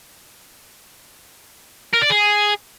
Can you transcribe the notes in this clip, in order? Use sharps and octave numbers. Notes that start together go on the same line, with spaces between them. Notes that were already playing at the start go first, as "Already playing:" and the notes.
A#4
D5
G#4